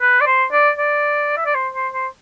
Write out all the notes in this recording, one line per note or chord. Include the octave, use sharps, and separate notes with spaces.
B4
D5
C5
D5
D5
E5
D5
C5
C5
C5